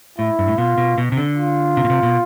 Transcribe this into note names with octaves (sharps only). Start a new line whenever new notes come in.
A2 E4
G2
A2
B2 F4
B2
B2
C3
D3
F4
C3
B2
C3
B2